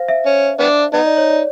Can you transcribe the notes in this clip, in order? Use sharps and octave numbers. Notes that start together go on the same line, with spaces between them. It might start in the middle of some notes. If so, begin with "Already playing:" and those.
Already playing: C5 F5
E5
C#4
B3 D4
B3 D#4 D#5
D5
C#5
D5